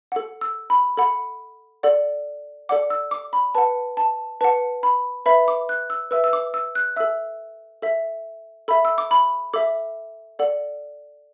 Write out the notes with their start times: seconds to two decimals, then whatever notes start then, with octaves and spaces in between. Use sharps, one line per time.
0.12 A4 F#5
0.41 E6
0.70 B5
0.97 A4 F#5 B5
1.83 A4 D5 F#5
2.69 A4 D5 F#5 D6
2.90 E6
3.11 D6
3.33 B5
3.55 B4 F#5 A5
3.97 A5
4.41 B4 F#5 A5
4.83 B5
5.26 B4 E5 B5
5.48 D6
5.69 F#6
5.90 E6
6.11 B4 E5 E6
6.24 E6
6.33 D6
6.54 E6
6.75 F#6
6.96 A4 E5 E6
7.82 A4 E5
8.68 A4 E5 B5
8.85 E6
8.98 D6
9.11 B5
9.54 A4 E5 D6
10.39 A4 D5 F#5